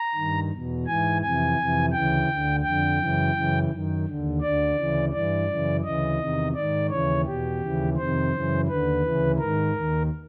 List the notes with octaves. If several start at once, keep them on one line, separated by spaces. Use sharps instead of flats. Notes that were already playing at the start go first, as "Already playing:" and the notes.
Already playing: A#5
G2 D#3
E2 B2
G#2 E3 G#5
F2 C3 E3 G#5
F2 C3 E3
D2 C#3 E3 G5
D2 D3
F2 D3 G5
F#2 C#3 E3
F#2 C#3 E3
F#2 D#3
D#2 D3
D2 D3 D5
D2 C#3 E3
G2 E3 D5
F#2 C#3 E3
D2 C#3 E3 D#5
E2 C3 D#3
G#2 D#3 D5
D#2 C#3 E3 C#5
E2 B2 G4
D#2 C#3 E3
F2 C3 D#3 C5
F#2 C#3 E3
D#2 D3 B4
D2 C#3 E3
G#2 D#3 A#4
D#2 D#3